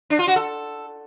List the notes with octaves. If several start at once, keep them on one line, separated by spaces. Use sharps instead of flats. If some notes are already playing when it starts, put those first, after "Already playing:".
D4
F4
F#4
A4